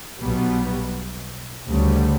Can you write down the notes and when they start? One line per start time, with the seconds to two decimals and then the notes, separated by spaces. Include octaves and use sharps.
0.20 B1 B2 G3 B3
1.67 D2 C#3 G3